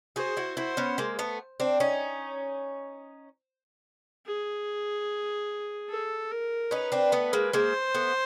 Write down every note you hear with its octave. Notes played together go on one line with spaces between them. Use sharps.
F#4 G#4 C5
E4 F#4
E4 F#4 C5
B3 C#4
G#3 A#3
A3 B3
C4 D4
C#4 D#4
G#4
A4
A#4
C#4 D#4 B4
C4 D4
A3 B3
G#3 A#3
G#3 A#3 C5
A3 B3